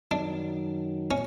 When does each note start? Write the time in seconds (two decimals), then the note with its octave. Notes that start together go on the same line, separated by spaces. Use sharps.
0.11 F#2 D#3 F#3 D4
1.11 A#2 C#4